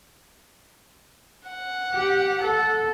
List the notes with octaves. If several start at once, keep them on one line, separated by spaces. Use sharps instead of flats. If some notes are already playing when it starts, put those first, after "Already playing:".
F#5
G4
A4